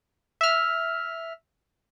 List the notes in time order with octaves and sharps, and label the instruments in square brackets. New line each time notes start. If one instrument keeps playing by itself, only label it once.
[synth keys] E5 F6